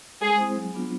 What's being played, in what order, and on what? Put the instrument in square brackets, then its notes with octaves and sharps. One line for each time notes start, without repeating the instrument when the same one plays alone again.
[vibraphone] G#3 [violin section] G#4
[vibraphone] C4 E4 G#4 C5
F#3
B3 D4 F4